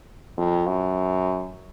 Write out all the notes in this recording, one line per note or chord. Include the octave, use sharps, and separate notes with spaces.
F2
F#2